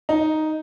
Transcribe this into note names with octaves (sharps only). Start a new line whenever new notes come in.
D#4